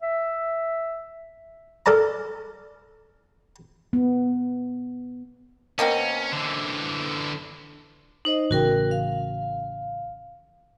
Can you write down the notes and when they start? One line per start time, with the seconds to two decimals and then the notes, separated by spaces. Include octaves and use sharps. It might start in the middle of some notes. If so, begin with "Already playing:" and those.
0.02 E5
1.86 A4 A#4 D5 A5 A#5
3.93 B3
5.79 B2 A#3 C4 C#4
6.32 D3 E3
8.25 D#4 C5 D#5
8.51 A1 C#3 F#4 A#4 G5
8.91 F5